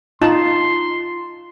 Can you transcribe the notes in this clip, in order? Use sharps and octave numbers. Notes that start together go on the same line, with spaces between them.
D#4 F4 A5 C6